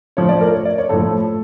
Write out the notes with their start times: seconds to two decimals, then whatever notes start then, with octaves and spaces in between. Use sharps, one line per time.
0.17 A2 F3 C#5
0.29 D5
0.41 A#4
0.54 C#5
0.65 D5
0.78 C#5
0.89 A2 F3 A4